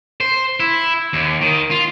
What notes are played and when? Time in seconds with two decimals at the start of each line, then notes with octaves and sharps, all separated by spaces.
0.21 C5
0.60 E4
1.13 D#2
1.41 D#3
1.71 F4